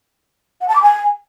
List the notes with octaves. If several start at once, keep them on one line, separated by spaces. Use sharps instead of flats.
F#5
A5
D6
G#5